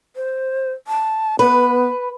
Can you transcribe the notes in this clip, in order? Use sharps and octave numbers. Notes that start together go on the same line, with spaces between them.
C5
A5
B3 B4